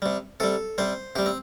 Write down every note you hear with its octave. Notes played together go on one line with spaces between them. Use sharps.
C3 G3
C3 G3 A4
C3 G3 C5
C3 G3 G4
C4